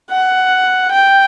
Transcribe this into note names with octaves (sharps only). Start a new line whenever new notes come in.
F#5
G5